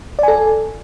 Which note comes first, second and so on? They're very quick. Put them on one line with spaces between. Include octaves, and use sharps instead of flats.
D5 G#5 A4